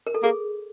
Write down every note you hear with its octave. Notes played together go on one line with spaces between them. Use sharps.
A#4
A4
A#3 G#4